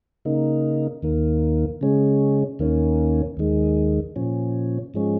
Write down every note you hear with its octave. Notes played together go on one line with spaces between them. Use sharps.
C#3 A#3 D#4
D#2 D#3 A#3
C#3 G#3 C#4
D#2 D#3 A#3 C#4
D#2 D#3 G#3
A#2 F3 C#4
G#2 F3 G#3 C#4